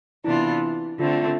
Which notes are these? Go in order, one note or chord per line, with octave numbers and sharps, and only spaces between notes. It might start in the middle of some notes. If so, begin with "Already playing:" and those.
C3 E3 B3 D4 E4 F4
D3 A3 C4 F4